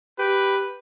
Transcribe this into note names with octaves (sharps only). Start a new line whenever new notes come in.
G4 B4